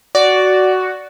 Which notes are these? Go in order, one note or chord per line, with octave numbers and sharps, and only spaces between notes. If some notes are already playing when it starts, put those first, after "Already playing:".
F#4 D5